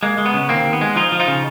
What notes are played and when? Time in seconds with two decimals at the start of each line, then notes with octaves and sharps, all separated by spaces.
0.03 G#3 A#3
0.18 G#3
0.26 B3
0.34 C#3
0.49 D#2 A#3 C4
0.65 D#2
0.73 B3
0.81 G#3
0.96 F3 D#4 F4
1.12 F3
1.20 D#4 F4
1.28 C#3